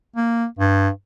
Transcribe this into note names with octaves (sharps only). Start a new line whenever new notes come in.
A#3
G2